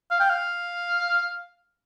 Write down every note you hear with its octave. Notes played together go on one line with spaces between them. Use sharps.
F5
G5
F5